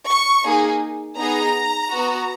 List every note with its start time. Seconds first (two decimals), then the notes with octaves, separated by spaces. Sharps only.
0.08 C#6
0.44 A#3 D#4 G#4
1.18 B3 D#4 G#4 A#5
1.92 B3 F#4